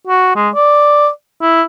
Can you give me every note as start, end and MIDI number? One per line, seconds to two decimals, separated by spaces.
0.07 0.34 66
0.35 0.50 56
0.55 1.09 74
1.41 1.63 64